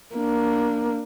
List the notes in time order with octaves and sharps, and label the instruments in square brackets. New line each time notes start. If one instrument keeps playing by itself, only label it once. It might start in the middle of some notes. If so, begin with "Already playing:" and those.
[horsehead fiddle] A#3 D4